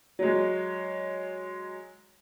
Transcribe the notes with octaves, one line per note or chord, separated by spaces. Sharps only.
F#3 G#3